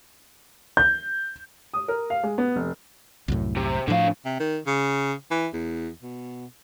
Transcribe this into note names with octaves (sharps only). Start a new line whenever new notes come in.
G6
D#6
A#4
F5
G#3
B3
F1
C2 F#2 A2
C3
A2 D3 F3 F5
C3
D#3
C#3
E3
E2
B2